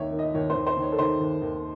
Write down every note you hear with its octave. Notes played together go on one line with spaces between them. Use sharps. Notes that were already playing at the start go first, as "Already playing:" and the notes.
Already playing: D#2 D#3 C#5 E5
D#3
D#5
D#2 C#5
C5
D#2
C5
D#3 C#5
A4
D#3 C5
D#2
D#2